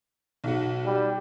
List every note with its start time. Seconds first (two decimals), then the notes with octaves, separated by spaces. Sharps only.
0.44 B1 F#4
0.86 G3